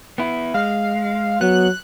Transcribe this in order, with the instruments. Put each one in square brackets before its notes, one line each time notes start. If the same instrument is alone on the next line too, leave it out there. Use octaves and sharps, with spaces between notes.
[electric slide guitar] B3 E4
[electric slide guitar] G#3 [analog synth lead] F5
[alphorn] F#3 [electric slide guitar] B3 [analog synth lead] F#6